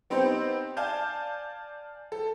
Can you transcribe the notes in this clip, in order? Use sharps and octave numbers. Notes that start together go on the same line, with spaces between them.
B3 C4 D#4 G4 C5
D5 F5 G#5 A5 F6 G6
A4